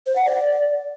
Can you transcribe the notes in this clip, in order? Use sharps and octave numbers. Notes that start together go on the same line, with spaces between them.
C5
F#5
D5